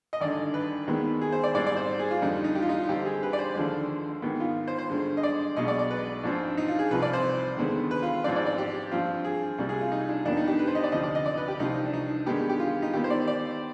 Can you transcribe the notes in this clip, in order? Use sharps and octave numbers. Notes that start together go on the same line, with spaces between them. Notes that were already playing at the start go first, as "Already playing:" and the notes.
D#5
G#1 G2 D3 D5
B4
D#2 D#3 G#3 B3
G#4
C5
D5
G#2 G3 C4 D5
D5
C5
G#4
F4
F2 D3 G3 D#4
D#4
G4
F4
D#4
F4
G2 D3 G3 C4 G4
G#4
B4
D5
C5
D#2 D3 F3 G#3
G#2 D#3 B3
F4
C5
C5
G2 D3 G#3
D#5
D5
B1 B2 G#3 D#5
D5
D5
B4
G#2 F3 C4 D4
D#4
F4
G#4
C2 C3 F3 C4 B4
D5
C5
D#2 D3 G#3 B3
B4
F4
F4
G#2 F3 C4 D5
D5
D5
G4
G2 F3 C4 F4
G#4
C2 C3 G3
G#4
F4
D#4
D4
F2 D#3 B3 D4
D#4
G4
B4
C5
D#5
D5
D2 C3 F3 D#5
D5
D#5
D5
B4
G4
C2 C3 F3 C4 D#4
D4
D#4
G2 D#3 G#3 B3 G4
G4
F4
D#4
D#2 D#3 B3 G4
C5
D5
D5